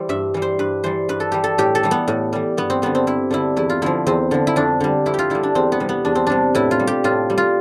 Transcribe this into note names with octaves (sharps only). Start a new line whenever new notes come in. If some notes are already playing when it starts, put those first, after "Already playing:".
Already playing: E3 G3 C5
G2 E5
E3 G3
C5
G2 B4
E3 G3 C5
G2 B4
A4
E3 G3 G4
A4
A2 G4
A4
E3 G3
B3
A2
E3 G3
G2 B3
C4
D3 G3 B3
C4
G2 E4
D3 G3 E4
E2 E4
F4
D3 F3 E4
E2 C4
D3 F3
E4
F2 D4
D3 G3
F2 E4
F4 G4
D3 G3 E4
D4
E2 C4
B3
C3 G3
B3
E2 D4
C4
C3 G3 D4
A2 E4
F4
G3
G4
A2 F4
G3
F4